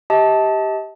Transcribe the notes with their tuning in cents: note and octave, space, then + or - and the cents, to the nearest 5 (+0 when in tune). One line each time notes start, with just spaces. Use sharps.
G4 +0 D#5 +45 A5 -5